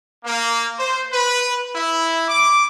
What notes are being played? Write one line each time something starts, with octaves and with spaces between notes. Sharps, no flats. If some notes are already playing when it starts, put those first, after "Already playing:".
A#3
C5
B4
E4
D6